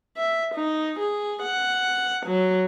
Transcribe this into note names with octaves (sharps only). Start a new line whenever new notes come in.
E5
D#4
G#4
F#5
F#3